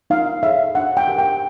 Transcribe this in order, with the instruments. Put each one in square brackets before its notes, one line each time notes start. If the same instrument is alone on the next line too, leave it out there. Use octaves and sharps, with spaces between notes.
[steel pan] D#4 F5
G#4 C#5 E5
D4 F#5
G5
G4 A#4
G5